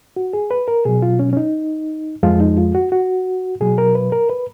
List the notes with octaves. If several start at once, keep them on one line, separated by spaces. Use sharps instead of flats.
F#4
G#4
B4
A#4
B2 F#3 G#4
F4
C#4
C#4
D#4
F2 F3 G#3 F4
D#4
F4
F#4
F#4
B2 F#3 G#4
A#4
B4
A#4
B4